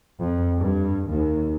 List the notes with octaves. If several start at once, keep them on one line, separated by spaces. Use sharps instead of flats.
F2
G2
D#2